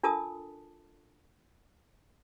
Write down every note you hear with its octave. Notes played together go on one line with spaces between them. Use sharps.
D4 F4 A4 A#4 A5 D#6